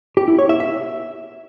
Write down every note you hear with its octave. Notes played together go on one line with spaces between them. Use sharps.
G4
E4
C#5
E5
E5